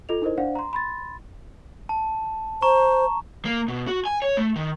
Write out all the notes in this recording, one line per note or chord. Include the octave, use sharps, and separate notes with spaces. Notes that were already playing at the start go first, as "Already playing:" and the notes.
F4 A4 D#5 F7
D#4 E4 A#4 C5 D#5
D4 C5 D5 F5 F#5
A#5 C6
B5 C6 A6
A5
C5 A#5 C#6
A#3
B2
F#4
G#5
C#5
A3
D#3